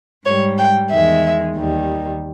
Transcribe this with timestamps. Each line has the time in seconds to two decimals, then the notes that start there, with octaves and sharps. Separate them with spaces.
0.25 G#2 G3 C#5
0.57 G5
0.90 E2 D#3 G#3 E5
1.55 D#2 D#3 G3